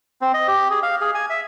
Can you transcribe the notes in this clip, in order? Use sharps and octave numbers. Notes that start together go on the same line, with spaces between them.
C4
D#5
G4
G#4
F5
G#4
G#5
E5